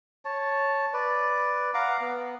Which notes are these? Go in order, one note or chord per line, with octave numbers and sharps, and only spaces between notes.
C#5 A5
B4 D5
F5 F#5 A#5 D6
B3